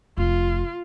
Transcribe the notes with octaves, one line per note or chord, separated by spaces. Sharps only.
F1 F4